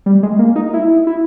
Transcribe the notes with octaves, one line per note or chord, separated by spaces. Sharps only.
G3
G#3
A#3
D#4
E4
E4